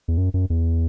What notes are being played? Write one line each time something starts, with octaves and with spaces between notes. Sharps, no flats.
E2
F#2
F#2
E2